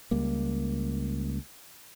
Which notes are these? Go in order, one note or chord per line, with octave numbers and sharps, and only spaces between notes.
C#2 G3 A#3